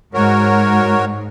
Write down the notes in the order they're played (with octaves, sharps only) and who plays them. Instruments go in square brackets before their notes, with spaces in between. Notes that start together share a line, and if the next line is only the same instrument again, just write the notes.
[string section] G#2 [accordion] F#4 A#4 C#5